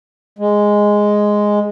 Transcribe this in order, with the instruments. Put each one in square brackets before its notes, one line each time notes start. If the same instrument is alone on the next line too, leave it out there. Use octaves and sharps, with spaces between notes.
[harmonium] G#3